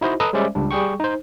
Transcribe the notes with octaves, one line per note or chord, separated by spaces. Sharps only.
D#4 E4 F#4 C5 D#5
A4 B4 D#5 A#5 D#6 E6
G3 G#3 C#4 C5 D5 E5
C#2 G3 D4
G3 G#4 G5 C#6
D#4 C5